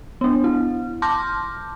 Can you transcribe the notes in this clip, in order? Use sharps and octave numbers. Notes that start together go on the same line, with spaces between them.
B3 D4
E4
A5 C6 D6 F6 G6 A#6